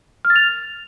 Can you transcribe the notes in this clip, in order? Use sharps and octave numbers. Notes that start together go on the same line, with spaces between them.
F6
A6
F7